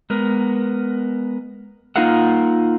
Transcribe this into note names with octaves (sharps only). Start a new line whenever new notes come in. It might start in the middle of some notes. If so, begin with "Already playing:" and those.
G#3 B3 A#4
A#3 D#4 F4 A#4 F5 F#5